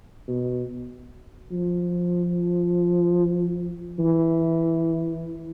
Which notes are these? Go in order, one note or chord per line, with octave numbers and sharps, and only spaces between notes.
B2
F3
E3